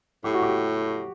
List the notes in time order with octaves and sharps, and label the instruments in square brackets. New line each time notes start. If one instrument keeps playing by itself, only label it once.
[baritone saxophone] A2 [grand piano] G4
[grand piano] F#4
G4